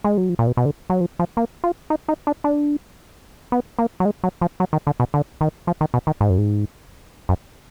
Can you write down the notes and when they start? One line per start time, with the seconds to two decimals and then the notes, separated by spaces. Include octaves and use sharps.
0.04 G#3
0.17 F#3
0.29 F3
0.39 A#2
0.47 B2
0.57 B2
0.65 D3
0.90 F#3
1.01 F3
1.19 F3
1.37 A#3
1.64 F4
1.90 D#4
2.08 D#4
2.27 D4
2.44 D4
3.52 B3
3.79 A#3
4.00 F#3
4.05 G#3
4.24 F#3
4.41 F3
4.60 F#3
4.73 D#3
4.87 D3
5.00 B2
5.14 D3
5.41 D#3
5.67 F3
5.81 D#3
5.94 B2
6.07 D#3
6.20 G#2
6.30 F#2
6.38 G#2
7.29 F#2